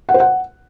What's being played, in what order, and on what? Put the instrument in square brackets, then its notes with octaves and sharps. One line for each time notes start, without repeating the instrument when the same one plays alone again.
[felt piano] F#5
C5
F#5